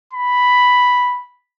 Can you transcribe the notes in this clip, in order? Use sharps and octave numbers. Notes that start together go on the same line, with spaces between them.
B5